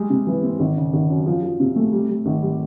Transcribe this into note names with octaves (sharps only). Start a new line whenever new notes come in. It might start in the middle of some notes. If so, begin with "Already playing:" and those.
Already playing: G3 G#3
C3
E3
C4
G#1
C#3
G#1
F#2
F3
F3
C3
A3
G3
G3
G#1
G3